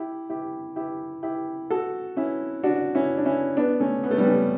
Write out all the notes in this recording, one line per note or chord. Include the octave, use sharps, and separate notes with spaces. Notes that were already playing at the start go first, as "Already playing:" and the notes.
Already playing: E4 G4
E4 G4
E4 G4
E4 G4
F#4 A4
C#4 E4
D4 F#4
C#4 E4
D4
C#4 E4
B3 D4
A3 C#4
B3
A3
G3 B3
A3 C#4